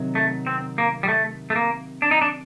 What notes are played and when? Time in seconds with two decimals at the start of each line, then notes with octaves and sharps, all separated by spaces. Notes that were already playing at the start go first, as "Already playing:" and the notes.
Already playing: C3 D#3 F#3
0.15 A3
0.47 C4
0.78 A#3
1.03 G3
1.08 A3
1.50 A3
1.56 A#3
2.02 D4
2.11 D#4
2.21 D4